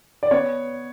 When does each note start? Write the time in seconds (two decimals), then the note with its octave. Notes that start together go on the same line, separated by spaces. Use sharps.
0.23 D5
0.31 B3 C#5